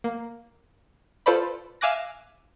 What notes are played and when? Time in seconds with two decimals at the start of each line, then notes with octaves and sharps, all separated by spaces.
0.04 A#3
1.26 F4 A4 B4 C5 D5 B5
1.81 E5 F5 G#5 D6 F#6 A#6